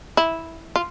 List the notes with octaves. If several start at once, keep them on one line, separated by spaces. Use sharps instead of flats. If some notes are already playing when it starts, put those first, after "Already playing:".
E4
F4